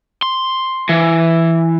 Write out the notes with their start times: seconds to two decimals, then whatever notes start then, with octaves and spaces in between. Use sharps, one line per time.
0.22 C6
0.89 E3